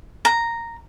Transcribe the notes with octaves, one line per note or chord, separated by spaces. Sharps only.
A#5